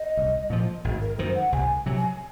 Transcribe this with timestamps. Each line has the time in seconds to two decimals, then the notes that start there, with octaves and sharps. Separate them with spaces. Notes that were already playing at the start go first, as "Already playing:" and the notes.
Already playing: D#5
0.17 C2
0.50 A#2 F3
0.84 G#1
1.01 A#4
1.18 F#2 D#3 C5
1.35 F#5
1.52 C2 G#5
1.86 C3 F#3
1.97 G#5